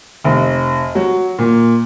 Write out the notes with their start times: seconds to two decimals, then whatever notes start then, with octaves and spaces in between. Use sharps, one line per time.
0.24 F1
0.95 F#3
1.38 A#2